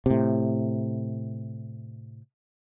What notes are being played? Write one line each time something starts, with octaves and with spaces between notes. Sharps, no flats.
A2 C3